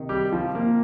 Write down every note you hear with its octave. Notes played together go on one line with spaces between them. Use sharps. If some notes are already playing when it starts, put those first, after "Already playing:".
Already playing: C3 D#3
G3 G4
F3 F4
A#3